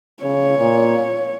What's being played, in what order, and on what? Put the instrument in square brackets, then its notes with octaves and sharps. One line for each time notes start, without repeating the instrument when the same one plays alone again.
[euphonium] C#3 [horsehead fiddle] C#5
[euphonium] A#2